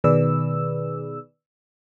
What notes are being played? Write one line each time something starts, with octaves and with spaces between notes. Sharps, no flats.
B2 D#3 G#4 B4 D5 E6